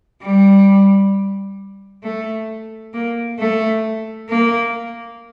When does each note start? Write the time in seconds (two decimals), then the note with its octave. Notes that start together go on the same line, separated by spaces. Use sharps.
0.22 G3
2.03 A3
2.93 A#3
3.39 A3
4.29 A#3